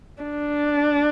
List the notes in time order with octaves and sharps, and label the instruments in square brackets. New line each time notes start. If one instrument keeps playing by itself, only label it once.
[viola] D4